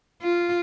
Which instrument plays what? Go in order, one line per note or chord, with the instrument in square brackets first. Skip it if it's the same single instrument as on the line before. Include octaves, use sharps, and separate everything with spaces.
[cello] F4